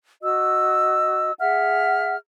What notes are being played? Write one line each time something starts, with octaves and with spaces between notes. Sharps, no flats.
F#4 D#5 E6
G#4 E5 F#5 F6